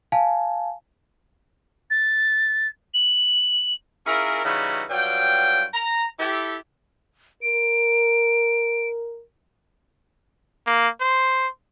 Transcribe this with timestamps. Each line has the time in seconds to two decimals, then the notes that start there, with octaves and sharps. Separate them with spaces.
0.12 F5 G#5 A5
1.90 A6
2.94 F#7
4.06 C#4 E4 F4 G#4 A#4
4.44 C#3 E3 G3 D#4 E4 F#4
4.90 G2 F#3 F4 G5
5.73 A#5
6.19 E4 G4 A4
7.42 A#4 D7
10.67 A#3
11.01 C5